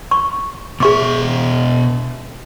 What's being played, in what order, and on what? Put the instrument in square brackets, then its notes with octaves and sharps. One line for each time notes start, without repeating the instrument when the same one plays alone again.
[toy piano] C#6
[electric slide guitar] B2 E5 [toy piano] G#4 C#6 D6